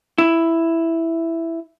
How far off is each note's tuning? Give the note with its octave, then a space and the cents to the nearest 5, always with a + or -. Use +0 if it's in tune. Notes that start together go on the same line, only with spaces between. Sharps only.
E4 +0